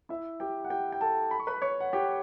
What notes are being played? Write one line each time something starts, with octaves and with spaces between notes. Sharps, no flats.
E4 E5
G4 G5
F#5
G4 G5
G5
A4 A5
B5
C#6
B4 B5
C#5 C#6
F#5
G4 G5